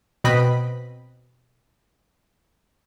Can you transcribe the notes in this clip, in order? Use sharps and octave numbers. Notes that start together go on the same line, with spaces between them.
B2 C4 B4 D#5 B5 B6